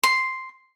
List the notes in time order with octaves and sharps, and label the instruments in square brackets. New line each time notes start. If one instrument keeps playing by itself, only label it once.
[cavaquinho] C6